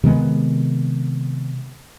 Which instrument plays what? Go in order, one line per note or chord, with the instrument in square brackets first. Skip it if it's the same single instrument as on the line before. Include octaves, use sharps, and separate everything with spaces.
[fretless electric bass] C3 D#3 G#3 B3